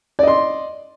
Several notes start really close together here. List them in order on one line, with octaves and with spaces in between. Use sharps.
D5 D#5 C6